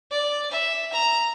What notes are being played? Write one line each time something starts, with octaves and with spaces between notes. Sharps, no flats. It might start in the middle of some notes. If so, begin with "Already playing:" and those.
D5
E5
A#5